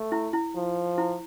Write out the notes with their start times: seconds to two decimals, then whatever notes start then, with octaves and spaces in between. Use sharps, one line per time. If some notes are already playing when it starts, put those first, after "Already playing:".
Already playing: A3
0.12 E4
0.33 E4
0.56 F3
0.98 E4